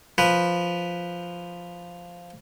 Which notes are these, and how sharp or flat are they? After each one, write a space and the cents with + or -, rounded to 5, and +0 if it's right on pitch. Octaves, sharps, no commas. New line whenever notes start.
F3 +0 B4 +0